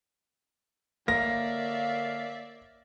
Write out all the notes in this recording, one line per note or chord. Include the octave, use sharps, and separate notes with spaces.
D3 A#3 C#5 D5 E5 F5 A#6